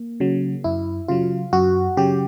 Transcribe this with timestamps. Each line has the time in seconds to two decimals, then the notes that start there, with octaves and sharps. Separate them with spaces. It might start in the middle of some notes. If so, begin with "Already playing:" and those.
Already playing: A#3
0.20 C#3 F#3
0.64 F#2 E4
1.08 C#3 F#3 F4
1.53 F#2 F#4
1.97 C#3 F#3 G4